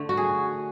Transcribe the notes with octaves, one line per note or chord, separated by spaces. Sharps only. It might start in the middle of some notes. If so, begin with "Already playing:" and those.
Already playing: D3 A3
F#4
G#4